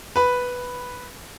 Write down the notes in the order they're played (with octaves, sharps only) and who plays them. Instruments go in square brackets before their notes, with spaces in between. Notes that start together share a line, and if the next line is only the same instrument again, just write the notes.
[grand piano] B4 B5